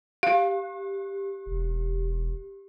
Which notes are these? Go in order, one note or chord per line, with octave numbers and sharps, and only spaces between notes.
G4 F5
E1